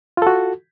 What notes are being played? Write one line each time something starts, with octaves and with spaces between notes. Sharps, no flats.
F4 F#4 A4